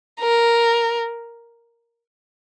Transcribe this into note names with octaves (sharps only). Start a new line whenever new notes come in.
A#4